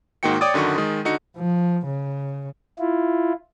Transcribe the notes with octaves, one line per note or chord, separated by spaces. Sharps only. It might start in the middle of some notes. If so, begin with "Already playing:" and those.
G#2 D#3 A#3 F#4 G5 C#7
C#5 D5 G5 D6 D#6 A6
F#2 D3 D#3 F#4 C#6
D#3 G#3
D3 D#4 F#4 C#7
F3
C#3
E4 F4